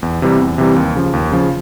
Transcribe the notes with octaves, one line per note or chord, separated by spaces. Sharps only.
E2
C3 E3 G3
E2
C3 E3 G3
D#2
C#3 F3
D#2
C#3 F3